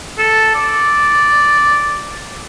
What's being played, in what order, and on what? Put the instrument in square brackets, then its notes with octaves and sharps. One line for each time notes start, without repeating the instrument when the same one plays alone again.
[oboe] A4
D5